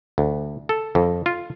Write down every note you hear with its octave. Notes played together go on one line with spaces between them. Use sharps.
D2
A4
F2
F4